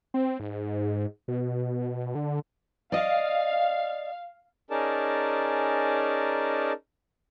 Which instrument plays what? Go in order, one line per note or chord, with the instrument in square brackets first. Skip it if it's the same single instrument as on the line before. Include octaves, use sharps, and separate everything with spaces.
[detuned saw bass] C4
G#2
B2
D3
[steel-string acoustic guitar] D5 D#5 [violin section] F5
[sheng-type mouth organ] C#4 D#4 G#4 A#4 D5 A5